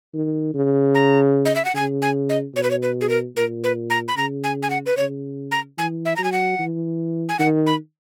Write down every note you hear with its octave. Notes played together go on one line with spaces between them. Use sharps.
D#3
C#3
A#5
D#5
E5
F#5
C#3 G#5
G#5
D#5
B2 C#5
B4
C#5
B4
G#4
A#4
A#2 A#4
B4
A#5
B5
C#3 A#5
G#5
G#5
F#5
B4
C#3 C#5
A#5
E3 G#5
E5
F#3 A#5
G#5
F#5
E3
G#5
D#3 F#5
B5